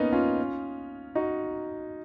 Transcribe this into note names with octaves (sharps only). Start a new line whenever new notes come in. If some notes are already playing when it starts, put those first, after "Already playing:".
Already playing: A#3 B3 C#4 D#4
C#4 F4
D#4 F#4